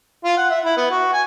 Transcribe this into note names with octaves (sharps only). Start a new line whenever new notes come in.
F4
F#5
E5
E4
B3
F#4
G#5